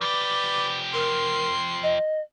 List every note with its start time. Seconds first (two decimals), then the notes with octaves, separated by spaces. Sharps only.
0.01 F3 G4 B4 D5
0.94 A#4 C6
1.83 D#5